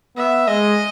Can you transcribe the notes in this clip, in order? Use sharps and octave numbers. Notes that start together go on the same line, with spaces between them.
B3 E5
G#3 D#5